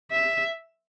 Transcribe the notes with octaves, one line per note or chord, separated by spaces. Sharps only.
E5